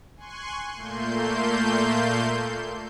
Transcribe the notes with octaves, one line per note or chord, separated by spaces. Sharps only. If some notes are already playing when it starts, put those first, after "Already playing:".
G#5 C6 C#6 F#6
A#2 A3 A#3 C6 G6